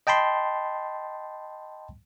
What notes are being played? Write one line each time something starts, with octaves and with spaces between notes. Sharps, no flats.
D#5 G5 A5 B5 C6